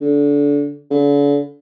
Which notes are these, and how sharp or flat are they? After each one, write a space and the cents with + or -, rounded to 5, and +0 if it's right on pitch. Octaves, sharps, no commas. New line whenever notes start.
D3 -25
D3 -45